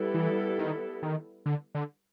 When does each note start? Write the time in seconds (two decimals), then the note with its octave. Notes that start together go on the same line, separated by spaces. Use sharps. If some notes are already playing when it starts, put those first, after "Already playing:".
Already playing: G3 B3 E4 A4
0.14 E3
0.58 D#3
1.03 D#3
1.46 D3
1.75 D3